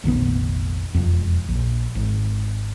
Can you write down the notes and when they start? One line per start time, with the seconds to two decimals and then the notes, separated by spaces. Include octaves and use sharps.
0.04 F1 A#1 D#3 B3
0.94 E1 F2
1.49 A#1
1.95 G#1